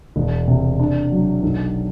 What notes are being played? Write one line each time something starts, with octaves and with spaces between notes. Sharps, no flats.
E1
C3
D4
F#3
B1